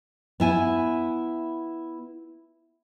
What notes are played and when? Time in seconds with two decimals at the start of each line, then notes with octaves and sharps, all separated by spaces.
0.40 B3 E4 G#5